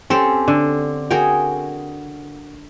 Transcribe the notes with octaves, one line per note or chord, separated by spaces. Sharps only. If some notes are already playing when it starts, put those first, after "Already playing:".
C4 C#4 G4 A4
D3
F#4 G#4 A#4 G5